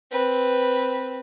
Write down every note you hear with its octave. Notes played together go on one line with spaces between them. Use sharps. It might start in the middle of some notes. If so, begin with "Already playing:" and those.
C4 B4